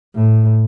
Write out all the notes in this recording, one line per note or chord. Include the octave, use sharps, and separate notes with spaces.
A2